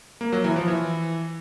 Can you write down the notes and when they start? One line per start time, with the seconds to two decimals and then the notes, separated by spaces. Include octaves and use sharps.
0.21 A#3
0.32 F#3
0.44 E3
0.56 F3
0.68 E3